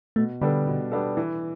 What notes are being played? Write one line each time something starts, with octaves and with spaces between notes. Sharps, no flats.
B2 A3
D3 G3 B3 D4 A4
B2
G3 B3 D4 A4
E3